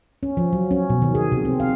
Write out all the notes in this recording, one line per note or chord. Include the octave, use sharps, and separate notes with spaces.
C#4
F3
F#3
C#4
B2
D#3
G#4
C3
C4
F5